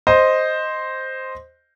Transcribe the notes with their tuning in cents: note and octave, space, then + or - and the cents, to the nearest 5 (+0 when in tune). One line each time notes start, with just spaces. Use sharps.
C5 +0 D#5 +0